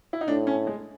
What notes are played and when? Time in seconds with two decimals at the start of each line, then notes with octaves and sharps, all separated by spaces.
0.13 E4
0.21 D#4
0.28 A2 D4
0.47 C#4
0.67 G#3